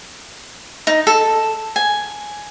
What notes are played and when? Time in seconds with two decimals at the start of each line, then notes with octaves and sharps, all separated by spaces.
0.87 D#4
1.07 A4
1.76 G#5